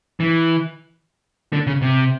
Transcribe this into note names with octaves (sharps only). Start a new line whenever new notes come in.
E3
D3
C#3
C3